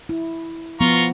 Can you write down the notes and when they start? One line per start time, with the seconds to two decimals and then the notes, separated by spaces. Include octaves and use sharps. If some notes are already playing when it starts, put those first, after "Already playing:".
0.09 E4
0.80 F3 B3 F4 A#5 C#6